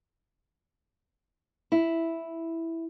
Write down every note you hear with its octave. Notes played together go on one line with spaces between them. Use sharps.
E4